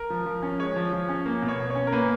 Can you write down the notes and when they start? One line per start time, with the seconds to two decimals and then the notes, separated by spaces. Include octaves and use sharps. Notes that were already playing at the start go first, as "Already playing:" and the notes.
Already playing: A#4
0.10 F3
0.26 F3
0.42 C#4
0.59 G#3 C#5
0.76 F3
0.93 F3
1.09 C#4
1.26 A#3
1.42 B2
1.48 C#5
1.60 B2
1.70 C#5
1.75 C#4
1.87 A#4
1.92 A#3 B4